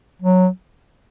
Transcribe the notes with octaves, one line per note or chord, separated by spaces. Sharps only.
F#3